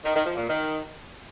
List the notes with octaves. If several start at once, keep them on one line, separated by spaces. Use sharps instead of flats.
D#3
D#3
F3
A#2
D#3